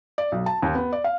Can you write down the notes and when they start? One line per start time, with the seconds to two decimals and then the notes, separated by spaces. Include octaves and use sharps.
0.18 D5
0.32 B1
0.46 A5
0.62 D#2
0.75 B3
0.93 D5
1.04 F5